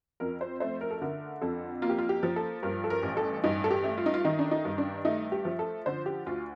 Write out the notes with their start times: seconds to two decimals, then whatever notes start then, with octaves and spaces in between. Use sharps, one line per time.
0.20 F2 A#4
0.41 C5
0.60 A3 C5
0.81 A#4
0.91 A4
1.02 D3 A#4
1.42 F2 A4
1.82 A#3 F4
1.90 G4
1.98 F4
2.09 G4
2.23 F3
2.36 A4
2.63 G2 A#4
2.84 A4
2.90 A#4
3.03 A1
3.17 A4
3.44 G2 D#4
3.64 A4
3.71 G4
3.84 A3
3.98 F4
4.06 D#4
4.14 F4
4.25 D#3 D#4
4.39 D4
4.51 D#4
4.65 G2
4.78 D4
5.05 A3 D#4
5.32 G4
5.45 F3
5.59 A4
5.86 D3 C5
6.06 G4
6.26 D2 F4